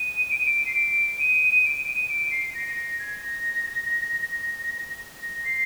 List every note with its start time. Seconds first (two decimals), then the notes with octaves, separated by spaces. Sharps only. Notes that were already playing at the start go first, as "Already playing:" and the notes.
Already playing: D#7
0.31 D7
0.38 D#7
0.46 D7
0.66 C7
0.75 D7
1.19 D#7
1.65 D7
1.87 D#7
2.09 D7
2.31 C7
2.50 C7
2.55 A#6
2.76 A#6
2.99 G#6
3.22 A#6
5.22 A#6
5.44 C7